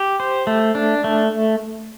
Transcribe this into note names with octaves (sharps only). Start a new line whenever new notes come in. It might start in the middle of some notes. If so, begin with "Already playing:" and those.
Already playing: G4
C5
A3
D4
A3